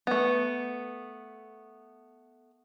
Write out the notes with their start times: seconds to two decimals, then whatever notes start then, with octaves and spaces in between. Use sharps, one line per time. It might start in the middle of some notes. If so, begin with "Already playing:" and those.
0.07 A3 B3